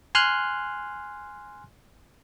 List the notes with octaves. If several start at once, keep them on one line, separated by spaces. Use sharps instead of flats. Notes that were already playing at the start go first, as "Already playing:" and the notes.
G#5 C6 F6 F#6